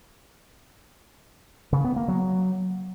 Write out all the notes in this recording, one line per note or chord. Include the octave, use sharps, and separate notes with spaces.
C#3
B3
A#3
F#3